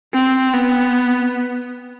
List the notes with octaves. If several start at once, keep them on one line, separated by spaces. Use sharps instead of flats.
C4
B3